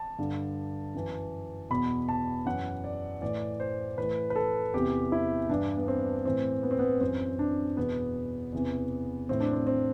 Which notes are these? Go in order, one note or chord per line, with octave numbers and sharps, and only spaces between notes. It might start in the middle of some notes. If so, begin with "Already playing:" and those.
Already playing: A5
G2 D3
F#2 E3
E2 B2 B5
A5
F#2 E3 F#5
D5
A2 E3 D5
C5
A2 E3 B4
B4
A4
E2 C3 E3 G4
E4
G2 E3 D4
B3
C4
A2 E3 C4
B3
C4
B3
F#2 E3 C4
D4
E2 B2 B3
E2 C3 E3
A2 E3 C4
D4
C4
C4